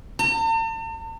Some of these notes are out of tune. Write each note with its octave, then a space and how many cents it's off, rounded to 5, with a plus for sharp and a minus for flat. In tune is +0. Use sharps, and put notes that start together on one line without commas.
A5 +45